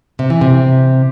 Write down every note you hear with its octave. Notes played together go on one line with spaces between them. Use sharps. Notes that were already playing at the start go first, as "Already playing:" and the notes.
C3
E3
C3